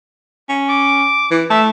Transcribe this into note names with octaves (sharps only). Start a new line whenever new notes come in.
C#4
D6
E3
A3 E5